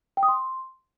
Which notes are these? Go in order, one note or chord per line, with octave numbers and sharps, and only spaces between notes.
G5
D#6
C6